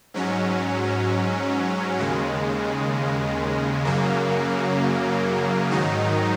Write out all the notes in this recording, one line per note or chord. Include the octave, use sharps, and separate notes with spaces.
G#2 F#3 C#4
D#2 C#3 G#3
F#2 C#3 F#3 A#3
G#2 D#3 F#3 D#4